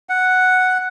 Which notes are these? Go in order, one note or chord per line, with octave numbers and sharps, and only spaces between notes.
F#5